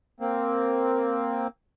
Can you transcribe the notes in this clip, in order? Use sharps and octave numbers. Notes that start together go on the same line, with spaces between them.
A#3 C4